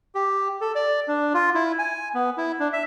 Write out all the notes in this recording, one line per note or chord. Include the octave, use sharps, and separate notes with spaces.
G4
A4
D5
D4
F4
E4
G#5
B3
E4
D4
E5